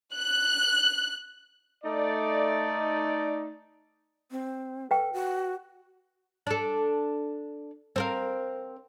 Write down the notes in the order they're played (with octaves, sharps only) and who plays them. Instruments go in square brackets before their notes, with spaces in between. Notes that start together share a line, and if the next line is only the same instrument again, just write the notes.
[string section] F#6
[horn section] A3 D#4 D5
[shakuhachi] C4
[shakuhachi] A4 [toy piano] B4 G5
[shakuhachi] F#4
[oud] D4 A4
C4 A#4 F5